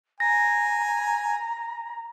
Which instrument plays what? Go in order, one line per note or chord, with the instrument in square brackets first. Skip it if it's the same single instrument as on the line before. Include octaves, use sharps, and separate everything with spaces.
[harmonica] G#5 [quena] A#5 [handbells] A#6